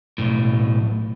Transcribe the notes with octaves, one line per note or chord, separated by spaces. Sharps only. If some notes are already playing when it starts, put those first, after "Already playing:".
B1 A2